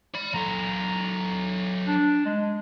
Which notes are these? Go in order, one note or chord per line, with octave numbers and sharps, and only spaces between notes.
D5 B5
F#3 A4 A#5
D4
G#3